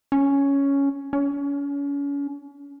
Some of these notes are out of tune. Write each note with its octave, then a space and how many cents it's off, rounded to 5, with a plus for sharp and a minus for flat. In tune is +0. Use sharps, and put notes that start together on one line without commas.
C#4 +5
C#4 +35